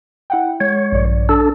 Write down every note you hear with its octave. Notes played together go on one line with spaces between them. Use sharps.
E4 F#5 G5
G#3 C#5
A#1 G2 D5
D4 A4